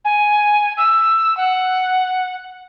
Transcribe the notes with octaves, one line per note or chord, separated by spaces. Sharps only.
G#5
E6
F#5